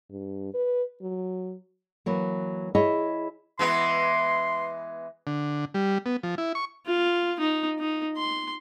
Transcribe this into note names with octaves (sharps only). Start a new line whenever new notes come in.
G2
B4
F#3
E3 F#3 A#3
E4 G#4 C#5 D#5 E5
E3 G#3 B3 C6
D3
G3
B3
F3
E4
C#6
F4
D#4
D#4
C6